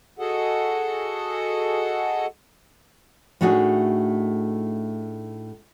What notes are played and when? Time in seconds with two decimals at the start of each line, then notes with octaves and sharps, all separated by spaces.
0.19 F#4 G#4 A4 D#5 F#5
3.41 A2 A3 D4 D#4 F#4 G#4